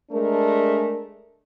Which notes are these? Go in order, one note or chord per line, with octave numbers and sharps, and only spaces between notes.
G#3 A3 D4 A#4